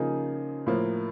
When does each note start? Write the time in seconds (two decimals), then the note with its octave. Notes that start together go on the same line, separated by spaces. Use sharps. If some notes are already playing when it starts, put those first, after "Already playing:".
Already playing: C#3 F3 A#3 D#4 G#4
0.66 A2 F3 A#3